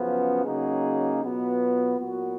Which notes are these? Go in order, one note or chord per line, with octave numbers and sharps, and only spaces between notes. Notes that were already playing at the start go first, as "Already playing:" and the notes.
Already playing: F#2 C#3 F3 B3
C#3 F#3 A#3 D#4 G#4
B2 F#3 B3 F4
A#2 F#3 B3 F#4 A#4